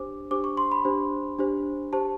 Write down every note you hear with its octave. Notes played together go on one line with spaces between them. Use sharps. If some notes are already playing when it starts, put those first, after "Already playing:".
Already playing: D4 G4 C5 D6
D4 G4 C5 D6
C#6
C6
B5
D4 G4 C5
D4 G4 C5
G4 C5 A5